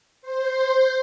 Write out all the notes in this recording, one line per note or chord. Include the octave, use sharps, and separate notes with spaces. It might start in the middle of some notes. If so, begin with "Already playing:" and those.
C5